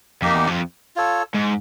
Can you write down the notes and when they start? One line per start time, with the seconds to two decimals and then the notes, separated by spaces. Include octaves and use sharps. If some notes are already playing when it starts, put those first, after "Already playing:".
0.22 F2 A#3 D#4 G4
0.34 E2
0.47 F2
0.96 F4 A4 C#5
1.34 G#2